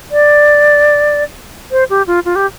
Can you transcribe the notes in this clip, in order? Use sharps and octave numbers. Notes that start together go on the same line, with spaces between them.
D5
C5
G4
F4
F4
G4